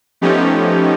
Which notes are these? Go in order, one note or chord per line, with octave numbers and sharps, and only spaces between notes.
F3 A3 B3 C#4 D#4 G4